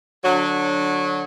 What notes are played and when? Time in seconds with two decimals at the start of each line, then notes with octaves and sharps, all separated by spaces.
0.25 D3 F#3